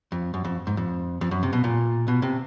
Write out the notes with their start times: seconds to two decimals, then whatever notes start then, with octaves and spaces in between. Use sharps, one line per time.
0.12 F2
0.34 F#2
0.45 F2
0.67 G#2
0.77 F2
1.21 F2
1.31 F#2
1.43 C3
1.53 B2
1.64 A#2
2.08 B2
2.22 C3